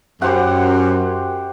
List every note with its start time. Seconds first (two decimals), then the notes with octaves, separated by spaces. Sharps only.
0.22 F#2 G4 C5 F#5